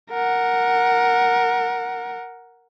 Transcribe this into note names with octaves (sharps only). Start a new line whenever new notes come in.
A#4 F#5